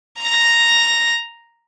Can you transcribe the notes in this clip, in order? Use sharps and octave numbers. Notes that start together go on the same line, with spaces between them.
A#5 A#6